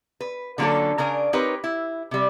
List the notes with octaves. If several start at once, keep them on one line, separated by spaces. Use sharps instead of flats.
B4
D3 F#3 A#3 C#4 F4 A4
C#3 D4 A#4 G#5
C4 D#4 G4 A#4 B4 C#5
E4
C3 G3